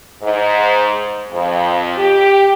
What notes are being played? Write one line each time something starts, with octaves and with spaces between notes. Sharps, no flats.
G#2
F2
G4